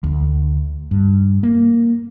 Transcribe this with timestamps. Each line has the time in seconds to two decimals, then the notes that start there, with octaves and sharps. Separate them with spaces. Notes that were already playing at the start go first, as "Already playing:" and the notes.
0.04 D2
0.91 G2
1.43 A#3